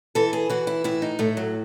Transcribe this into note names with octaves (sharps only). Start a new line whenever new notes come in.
E3 A4
G#4
E3 F#4
E4
A2 E4
D#4
A2 A3
F#3